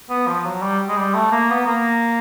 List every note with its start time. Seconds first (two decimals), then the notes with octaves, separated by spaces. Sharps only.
0.10 B3
0.27 F3
0.45 F#3
0.62 G3
0.89 G#3
0.97 G3
1.15 A3
1.32 A#3
1.50 B3
1.67 A#3